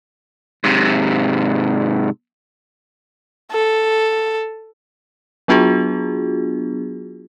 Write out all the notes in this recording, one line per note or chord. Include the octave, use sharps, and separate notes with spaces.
G#2 C3
A4
F#3 B3 D4 F4 F#4 G#4